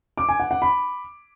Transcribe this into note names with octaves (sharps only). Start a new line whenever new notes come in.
D6
G#5
F#5
F#5
B5